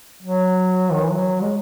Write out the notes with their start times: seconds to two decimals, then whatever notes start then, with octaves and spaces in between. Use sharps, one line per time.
0.23 F#3
0.92 D#3
1.02 E3
1.12 F#3
1.41 G#3